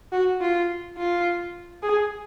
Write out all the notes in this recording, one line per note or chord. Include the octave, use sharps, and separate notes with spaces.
F#4
F4
F4
G#4